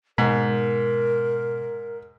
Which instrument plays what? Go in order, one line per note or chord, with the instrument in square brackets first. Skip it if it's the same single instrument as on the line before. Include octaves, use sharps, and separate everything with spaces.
[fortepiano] G#2 [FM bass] B2 [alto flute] A#4